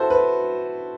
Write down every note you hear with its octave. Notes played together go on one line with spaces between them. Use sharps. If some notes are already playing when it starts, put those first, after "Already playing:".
Already playing: E4 F#4 A4 C5
B4